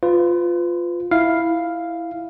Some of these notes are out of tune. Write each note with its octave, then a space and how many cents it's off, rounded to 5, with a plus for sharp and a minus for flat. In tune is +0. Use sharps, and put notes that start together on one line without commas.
F4 +0 B4 +30
E4 +0 F5 +0